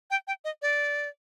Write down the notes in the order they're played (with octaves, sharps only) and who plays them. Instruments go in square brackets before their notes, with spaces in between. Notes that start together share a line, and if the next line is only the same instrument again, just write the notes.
[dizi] G5
G5
D#5
D5